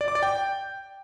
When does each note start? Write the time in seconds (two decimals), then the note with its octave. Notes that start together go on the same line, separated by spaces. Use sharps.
0.01 D5
0.08 D6
0.15 D5
0.23 G5